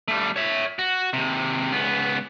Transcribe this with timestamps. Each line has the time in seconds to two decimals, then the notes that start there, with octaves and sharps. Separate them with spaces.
0.08 G3 A3
0.36 C#5 E5
0.79 F#4
1.13 D#2 C3
1.71 C#2 B3